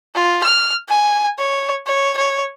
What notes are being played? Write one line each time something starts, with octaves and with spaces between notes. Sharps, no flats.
F4
F6
G#5
C#5
C#5
C#5